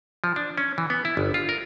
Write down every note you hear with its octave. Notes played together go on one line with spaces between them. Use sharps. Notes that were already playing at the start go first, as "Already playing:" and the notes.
F3
D4
C#4
E3
B3
E4
G1
F4
A#4